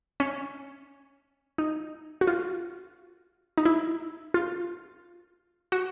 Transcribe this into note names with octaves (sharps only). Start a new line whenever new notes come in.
C#4
D#4
F#4
F4
D#4
E4
F4
F#4